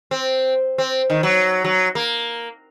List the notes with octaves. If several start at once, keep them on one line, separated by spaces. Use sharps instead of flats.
C4
C4
D#3
F#3
F#3
A#3